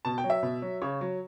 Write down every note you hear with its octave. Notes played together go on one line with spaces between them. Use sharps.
B2 A5
G5
F#3
E5
B2
F#3
C#3 C#5
F#3